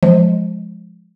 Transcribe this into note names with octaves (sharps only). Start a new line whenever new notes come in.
F3 G#3